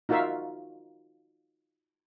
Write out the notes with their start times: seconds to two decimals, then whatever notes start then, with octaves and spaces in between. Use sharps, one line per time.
0.09 D#4 F4 F#4 A#4 E5 F5